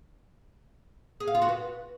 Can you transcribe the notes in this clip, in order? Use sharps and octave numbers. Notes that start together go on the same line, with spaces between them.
G#4
F5
F4
F#4
B4